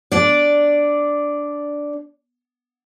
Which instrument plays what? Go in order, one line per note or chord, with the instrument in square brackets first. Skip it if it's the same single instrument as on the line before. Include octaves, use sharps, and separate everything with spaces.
[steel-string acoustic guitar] D4 D5